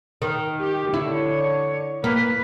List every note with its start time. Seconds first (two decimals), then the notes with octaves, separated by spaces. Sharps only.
0.22 D#3
0.60 G4
0.94 D3 E4 C#5
2.04 A#3 B4